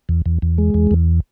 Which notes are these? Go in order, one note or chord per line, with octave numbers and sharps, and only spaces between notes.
E2
E2
E2
G#3
E2
E2